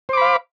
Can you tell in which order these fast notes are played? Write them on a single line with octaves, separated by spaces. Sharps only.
C5 D6 B5 F5